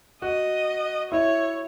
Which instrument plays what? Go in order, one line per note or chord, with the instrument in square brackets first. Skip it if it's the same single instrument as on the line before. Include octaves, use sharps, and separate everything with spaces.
[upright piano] F#4 [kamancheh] D#5
[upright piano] E4 [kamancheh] C#5